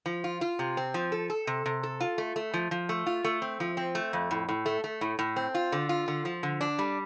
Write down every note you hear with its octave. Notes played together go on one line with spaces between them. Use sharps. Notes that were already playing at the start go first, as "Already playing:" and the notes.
F3
F4
F4
C3
C4
F3
A4
A4
C3
C3
A4
F4
A3
A3
F3
F3
A3
F4
A3
C4
F3
C4
A3
F2
A2
A2
A3
A3
A2
A2
C4
F4
D3
F4
D3
F3
D3
D4
G3